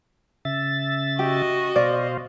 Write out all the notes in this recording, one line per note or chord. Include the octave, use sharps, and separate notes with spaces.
C#3 E5 A6
F#4 G4 D#5
B2 C5 D5 F5